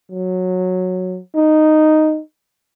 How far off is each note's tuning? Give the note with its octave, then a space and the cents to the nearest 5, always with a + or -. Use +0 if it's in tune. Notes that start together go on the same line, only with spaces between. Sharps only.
F#3 -10
D#4 -5